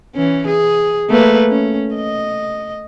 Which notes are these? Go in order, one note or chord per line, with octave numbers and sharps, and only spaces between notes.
E3 C#4
G#4
A3 A#3 B4
C#4
D#5